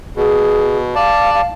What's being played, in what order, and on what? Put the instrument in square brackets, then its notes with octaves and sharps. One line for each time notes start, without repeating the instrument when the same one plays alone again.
[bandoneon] B2 [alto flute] G#4
[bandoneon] D5 A5 [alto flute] F5
[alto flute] F5